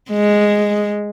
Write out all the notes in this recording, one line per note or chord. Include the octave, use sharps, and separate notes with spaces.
G#3